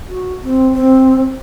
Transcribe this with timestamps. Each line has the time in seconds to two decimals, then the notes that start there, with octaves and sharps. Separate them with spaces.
0.09 F#4
0.44 C4
0.73 C4